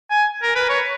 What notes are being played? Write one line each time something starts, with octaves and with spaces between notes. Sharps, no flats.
G#5
A#4
B4
C#5